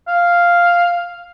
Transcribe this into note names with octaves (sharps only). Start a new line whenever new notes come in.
F5